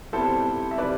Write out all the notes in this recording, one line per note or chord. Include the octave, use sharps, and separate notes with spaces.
C3 G3 B3 E4 A4 C5
E5
C3 G3 B4 D5